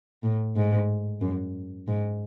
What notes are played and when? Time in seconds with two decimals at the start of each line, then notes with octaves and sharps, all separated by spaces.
0.23 A2
0.56 G#2
1.21 F#2
1.88 G#2